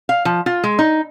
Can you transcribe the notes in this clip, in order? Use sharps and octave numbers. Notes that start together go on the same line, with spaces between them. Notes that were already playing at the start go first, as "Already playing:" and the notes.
F5
F3
F4
G#3
D#4